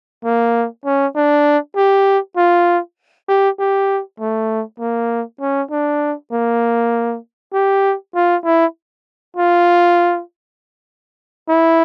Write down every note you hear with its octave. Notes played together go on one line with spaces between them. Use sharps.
A#3
C#4
D4
G4
F4
G4
G4
A3
A#3
C#4
D4
A#3
G4
F4
E4
F4
E4